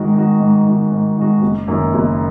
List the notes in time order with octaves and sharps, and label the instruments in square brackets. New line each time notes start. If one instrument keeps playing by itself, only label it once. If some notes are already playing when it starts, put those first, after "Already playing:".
Already playing: [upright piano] G#2 D#3 G#3 F#4
D#3 G#3 F#4
G#2
D#3 G#3 F#4
G#2
D#3 G#3 F#4
F#1
F#2 D#3 A#3
F#1